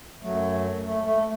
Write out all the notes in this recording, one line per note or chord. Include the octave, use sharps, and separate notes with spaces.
F#2 F#3 A3
A3
A3